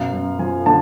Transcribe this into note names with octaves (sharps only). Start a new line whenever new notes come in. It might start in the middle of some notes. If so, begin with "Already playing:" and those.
Already playing: F#2 B2 F#3 F5
F#2
F3 G#5
D3 A5